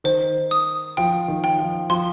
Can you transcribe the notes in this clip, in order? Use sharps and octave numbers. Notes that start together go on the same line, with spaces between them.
D#3 C5
D#6
F3 G5
D#3
G5
F3
F3 C6